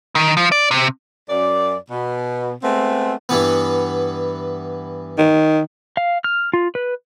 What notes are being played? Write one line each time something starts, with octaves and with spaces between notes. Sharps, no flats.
D#3
F3
D5
C3
F#2 D5
B2
G#3 A3 B3 C4
G2 E3 B3
D#3
F5
F6
F4
B4